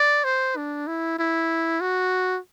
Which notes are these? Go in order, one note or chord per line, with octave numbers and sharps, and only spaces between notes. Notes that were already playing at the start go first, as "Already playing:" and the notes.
Already playing: D5
C5
D4
E4
E4
F#4